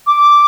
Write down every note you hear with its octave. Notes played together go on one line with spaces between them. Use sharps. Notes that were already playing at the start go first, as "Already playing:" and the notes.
D6